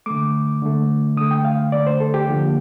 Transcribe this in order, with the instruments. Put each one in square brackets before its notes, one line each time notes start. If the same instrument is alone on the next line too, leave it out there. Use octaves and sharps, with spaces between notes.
[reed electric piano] D3 A3 D6
D3 A3
D3 A3 D#6
G5
F5
D3 A3 D5
C5
A4
G4
D3 F3 A#3